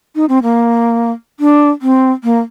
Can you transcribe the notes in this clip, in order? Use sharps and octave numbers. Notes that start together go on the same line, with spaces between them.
D#4
C4
A#3
D4
C4
A#3